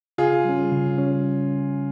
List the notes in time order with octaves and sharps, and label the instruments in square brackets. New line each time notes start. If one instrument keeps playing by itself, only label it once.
[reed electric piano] C#3 [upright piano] F4 G#4
[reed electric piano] G3 C#4
C#3
G3 C#4